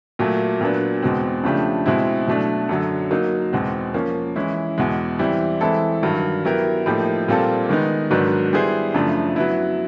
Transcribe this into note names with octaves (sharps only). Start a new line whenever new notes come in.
A#2 F#3 A3
A#2 F#3 B3 D4
E2 B2 G#3 C4
C#3 F3 A3 D4 G4
B2 G#3 C4 E4
B2 F#3 A3 D4
F#2 D3 F#3
F#3 A#3 D#4
E2 B2 G#3 C4
F3 A#3 C#4
E3 G#3 C#4 E4
E2 B2 G#3
E3 G3 C4 E4
E3 G#3 C4 E4 A4
G2 D#3 F#3
F#3 B3 E4 G4 A#4
A2 F3 A#3 D#4 G4
A#2 G3 C4 F4 A4
D#3 G#3 B3 D#4
G#2 D#3 F#3 B3 D4
G3 B3 E4 G#4 C5
F#2 C#3 F3 A3 D4
F#3 B3 E4